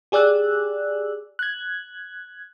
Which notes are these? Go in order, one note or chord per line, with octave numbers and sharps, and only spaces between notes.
G4 G#4 D5 E6 F#6
F#6 G#6